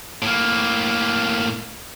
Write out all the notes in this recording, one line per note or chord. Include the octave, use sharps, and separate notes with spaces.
A2 A#3